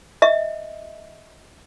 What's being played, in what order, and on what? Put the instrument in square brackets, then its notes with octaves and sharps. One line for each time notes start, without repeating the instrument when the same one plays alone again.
[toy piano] D#5 E5